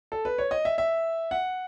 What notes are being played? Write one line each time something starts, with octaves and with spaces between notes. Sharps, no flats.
A4
B4
C#5
D#5
E5
E5
F#5